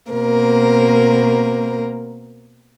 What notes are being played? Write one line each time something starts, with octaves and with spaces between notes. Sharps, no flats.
B2 A#3 C4 A#4